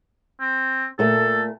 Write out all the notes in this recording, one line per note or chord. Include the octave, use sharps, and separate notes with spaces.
C4
A#2 A3 A4